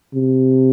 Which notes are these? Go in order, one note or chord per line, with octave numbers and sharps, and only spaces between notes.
C3